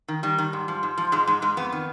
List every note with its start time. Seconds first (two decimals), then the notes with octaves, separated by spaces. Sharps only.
0.08 D#3
0.23 D#3 G3
0.38 D#3
0.53 G#2
0.68 F3
0.83 G#2
0.98 F3
1.12 G#2 G#3
1.27 G#2 G#3
1.42 G#2 G#3
1.57 F2 B3
1.72 D#3